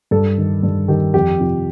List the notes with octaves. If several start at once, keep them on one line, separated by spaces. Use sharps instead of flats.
G2 A4
D#3
G2
D#3 G4
F2 G4
C3 F3